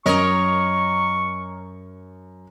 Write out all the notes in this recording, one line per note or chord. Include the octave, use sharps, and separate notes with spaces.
F#2 A#4 C#5 D#5 C#6